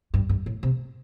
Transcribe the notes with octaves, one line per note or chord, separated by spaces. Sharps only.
G2
G2
A2
C3